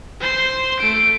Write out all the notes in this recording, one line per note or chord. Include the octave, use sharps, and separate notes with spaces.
C5 C6
A3 D7